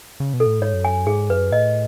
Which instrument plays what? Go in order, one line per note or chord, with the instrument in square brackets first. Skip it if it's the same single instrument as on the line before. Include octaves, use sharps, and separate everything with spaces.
[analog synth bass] C#3
B2
[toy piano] A4
[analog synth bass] A2
[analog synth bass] G#2 [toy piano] C#5
[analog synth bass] F#2
[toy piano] G#5
[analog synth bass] G#2 [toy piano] G#4
[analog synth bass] F#2 [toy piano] B4
[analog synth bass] A2 [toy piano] D#5